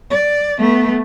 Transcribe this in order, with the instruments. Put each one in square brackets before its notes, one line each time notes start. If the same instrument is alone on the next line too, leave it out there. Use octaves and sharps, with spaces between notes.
[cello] D5
A3 B3